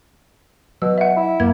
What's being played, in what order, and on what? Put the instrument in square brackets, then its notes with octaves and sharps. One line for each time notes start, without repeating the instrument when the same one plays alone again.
[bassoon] B2 [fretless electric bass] F#3 [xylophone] E6
[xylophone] E5 F#5
[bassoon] E4
[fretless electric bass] F#2 [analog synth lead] A#3 [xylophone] G#6